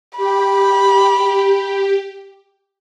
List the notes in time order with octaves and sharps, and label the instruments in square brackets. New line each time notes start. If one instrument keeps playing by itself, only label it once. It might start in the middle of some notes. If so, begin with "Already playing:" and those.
[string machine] G4 [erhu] B5